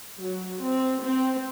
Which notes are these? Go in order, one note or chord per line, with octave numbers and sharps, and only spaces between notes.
F#3
C4
C4